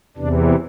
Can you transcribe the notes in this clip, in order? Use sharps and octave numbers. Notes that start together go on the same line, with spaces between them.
E2 C3 E3 D4